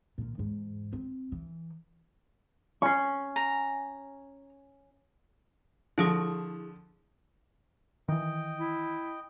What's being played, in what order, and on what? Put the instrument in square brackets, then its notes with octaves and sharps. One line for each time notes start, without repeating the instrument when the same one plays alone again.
[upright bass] A#2 D#3
E2 G#2
C4
E3
[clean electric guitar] C#4 [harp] C#6 C7
[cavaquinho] A#5
[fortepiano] D3 F3 [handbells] E4 G#4 D#6
[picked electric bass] D#3 E3 [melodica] D#5 G5
[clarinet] E4